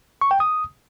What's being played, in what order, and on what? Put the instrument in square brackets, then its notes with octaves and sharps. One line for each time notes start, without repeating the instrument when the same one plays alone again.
[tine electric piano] C#6
G5
D#6